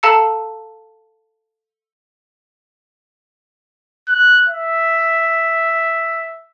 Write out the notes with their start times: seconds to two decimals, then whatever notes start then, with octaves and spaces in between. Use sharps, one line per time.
0.03 A4 F5 A5 A#5 E6 C#7
4.08 F#6
4.48 E5